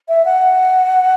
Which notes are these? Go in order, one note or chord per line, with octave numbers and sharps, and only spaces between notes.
E5
F#5